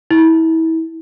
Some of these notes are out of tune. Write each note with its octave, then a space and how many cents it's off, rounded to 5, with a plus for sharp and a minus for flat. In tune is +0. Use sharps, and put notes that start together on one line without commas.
E4 -30